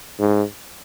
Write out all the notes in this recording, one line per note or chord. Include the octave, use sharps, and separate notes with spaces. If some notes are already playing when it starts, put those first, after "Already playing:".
G#2